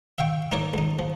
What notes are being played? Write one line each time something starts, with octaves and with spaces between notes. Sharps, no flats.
E5 F5 G5 C#6
D#4 E4 A#4 C#5 D5
C#2 D#4
F3